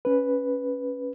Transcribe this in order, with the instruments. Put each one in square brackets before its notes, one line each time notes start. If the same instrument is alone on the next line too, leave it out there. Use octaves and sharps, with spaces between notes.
[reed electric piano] C#4 B4